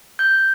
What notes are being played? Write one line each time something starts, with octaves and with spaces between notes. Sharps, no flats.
G6